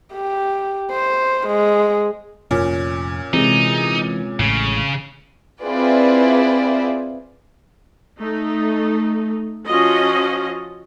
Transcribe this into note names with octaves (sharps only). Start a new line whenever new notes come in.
G4
C5
G#3
F1 A#2 C#4
C3 E3 G#3 D#4
A1 A2 C#3
C4 E4 F4 G#4 B4 D5
A3 D#4
F3 C#4 F4 F#4 D#5